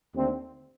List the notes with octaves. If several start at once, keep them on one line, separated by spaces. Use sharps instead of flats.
D#2 D3 A3 C4